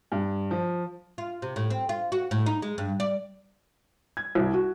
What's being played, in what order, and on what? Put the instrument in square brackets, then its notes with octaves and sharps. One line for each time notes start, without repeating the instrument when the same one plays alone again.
[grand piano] G2
F3
[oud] F4
C3
A2
C4
F4
F#4
A2
D#4
G#3
G2
D5
[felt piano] G#6
C2
F#4